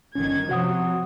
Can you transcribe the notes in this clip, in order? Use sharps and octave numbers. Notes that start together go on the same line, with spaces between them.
G1 D#3 C#4 G#6
C3 F3 F#3 F#4 F#5 D#6